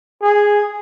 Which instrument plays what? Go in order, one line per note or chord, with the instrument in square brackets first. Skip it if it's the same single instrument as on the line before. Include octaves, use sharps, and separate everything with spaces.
[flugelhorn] G#4